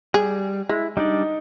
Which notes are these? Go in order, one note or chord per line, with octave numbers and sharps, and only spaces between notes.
G3 G#4
G#3 E4
G3 D4 D#4 D5